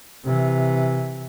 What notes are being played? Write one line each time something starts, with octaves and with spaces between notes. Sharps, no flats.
C3 E3